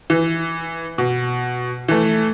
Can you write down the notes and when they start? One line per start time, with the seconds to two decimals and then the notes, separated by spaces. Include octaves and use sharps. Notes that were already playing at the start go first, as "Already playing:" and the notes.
0.10 E3
0.98 B2
1.88 E3 A3